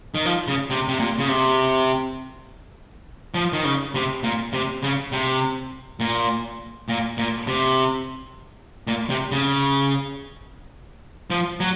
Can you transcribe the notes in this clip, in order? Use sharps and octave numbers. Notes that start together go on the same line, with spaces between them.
D#3
F3
C#3
C3
C3
A#2
C#3
C3
F3
D#3
C#3
C3
A#2
C3
C#3
C3
A#2
A#2
A#2
C3
A#2
C3
C#3
F3
F#3